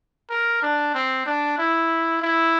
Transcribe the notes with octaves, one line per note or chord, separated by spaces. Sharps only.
A#4
D4
C4
D4
E4
E4